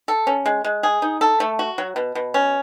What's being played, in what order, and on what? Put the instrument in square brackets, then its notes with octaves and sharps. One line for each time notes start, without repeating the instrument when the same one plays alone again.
[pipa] A4
C#4
G#3
G#3
G#4
D#4
A4
A3
F#4
F#3
B2
B2
C#4